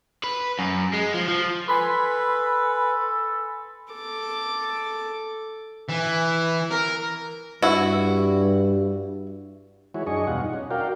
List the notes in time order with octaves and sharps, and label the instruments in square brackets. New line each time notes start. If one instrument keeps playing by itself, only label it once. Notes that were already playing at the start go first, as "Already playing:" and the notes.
[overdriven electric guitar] B4
F#2
G#3
F3
F3
[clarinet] A4 [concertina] B4 [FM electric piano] G#5 B5 C6
[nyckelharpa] A4 D6
[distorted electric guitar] E3
A#4
[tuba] G2 [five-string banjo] E4 F#4
[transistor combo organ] E3 G#3 E4 F#4 C#5
F#2 D4 G#4 D#5 C#6
E2 B2 G3 F4 F#5
D#4
C#4
F#4 A#4 D5 F5 G5